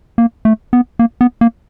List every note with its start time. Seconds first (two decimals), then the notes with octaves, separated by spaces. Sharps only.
0.18 A#3
0.45 A3
0.73 B3
0.99 A#3
1.21 B3
1.41 A#3